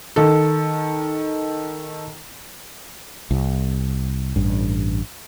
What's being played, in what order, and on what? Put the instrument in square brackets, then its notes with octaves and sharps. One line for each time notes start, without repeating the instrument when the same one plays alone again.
[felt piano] D#3 A4
[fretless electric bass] C2
A1 G2